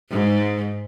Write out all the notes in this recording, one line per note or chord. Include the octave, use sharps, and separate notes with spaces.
G#2